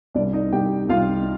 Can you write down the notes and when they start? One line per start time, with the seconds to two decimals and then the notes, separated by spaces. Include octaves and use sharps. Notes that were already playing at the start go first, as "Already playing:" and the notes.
0.15 C2 D4 D5
0.33 D#4 D#5
0.52 C2 G4 G5
0.89 C2 F4 F5